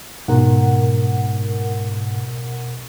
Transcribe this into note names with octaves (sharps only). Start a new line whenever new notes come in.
G#2 B2 A#4 F#5